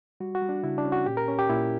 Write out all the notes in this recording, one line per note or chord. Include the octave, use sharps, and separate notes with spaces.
G3 F#4
F#4
G3
D4
C#3 E4
D4
C#4
F#4
A#2 G4
A#4
C#4
G4
A#2 E4